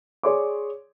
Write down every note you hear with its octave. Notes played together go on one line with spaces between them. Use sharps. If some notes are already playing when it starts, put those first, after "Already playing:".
G#4 C#5 D5 C6 D6